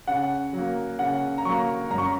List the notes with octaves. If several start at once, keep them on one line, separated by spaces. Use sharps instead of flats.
C#3 F#5
F#3
A#3
C#3 F#5
A#5
F#3 A#3 C#6
F#2 A#5
C#6